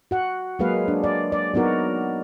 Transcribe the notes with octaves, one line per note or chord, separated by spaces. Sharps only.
F#4 F#5
F#3 G#3 A#3 G#4 B4 F5
D4
D5
D5
F#3 B3 D#4 F#4 A#4